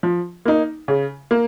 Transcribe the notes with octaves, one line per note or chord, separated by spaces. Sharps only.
F3
A#3 D#4
C#3
A#3